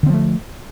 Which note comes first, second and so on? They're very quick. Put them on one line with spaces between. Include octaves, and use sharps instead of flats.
D3 C4 F3 A3